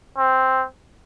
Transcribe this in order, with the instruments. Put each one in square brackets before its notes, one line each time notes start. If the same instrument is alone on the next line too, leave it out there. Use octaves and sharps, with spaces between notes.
[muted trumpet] C4